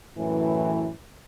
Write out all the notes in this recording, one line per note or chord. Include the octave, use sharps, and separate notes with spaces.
F#2 A2 E3